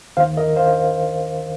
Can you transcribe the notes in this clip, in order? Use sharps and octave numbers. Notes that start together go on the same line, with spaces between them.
D#2 D#3 C5 F5
A#4 D#5
C5 F5